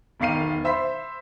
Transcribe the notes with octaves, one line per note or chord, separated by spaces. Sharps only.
E1 B1 D#3 F5 C7 D#7
C5 E5 B5 C6 B6